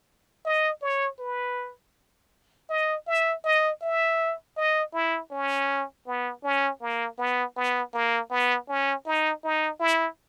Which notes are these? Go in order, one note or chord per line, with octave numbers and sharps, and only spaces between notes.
D#5
C#5
B4
D#5
E5
D#5
E5
D#5
E4
C#4
B3
C#4
A#3
B3
B3
A#3
B3
C#4
D#4
D#4
E4